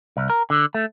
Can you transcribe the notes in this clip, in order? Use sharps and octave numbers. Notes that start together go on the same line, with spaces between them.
C2
A#4
D3
A3